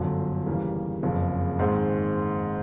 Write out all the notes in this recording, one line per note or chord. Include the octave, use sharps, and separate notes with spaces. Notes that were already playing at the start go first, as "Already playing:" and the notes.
Already playing: G1 F#2 D3 F3
D#2 C#3 E3 G3 A#3
F#1 F2 C#3
G#2 D#3 G#3 C4